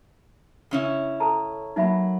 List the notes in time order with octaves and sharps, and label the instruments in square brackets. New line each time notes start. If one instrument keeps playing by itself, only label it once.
[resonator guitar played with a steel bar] C#3 C#4 E4
[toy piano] A4 A5 A#5
[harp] F#3 A#3 [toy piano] D#4 E5 B5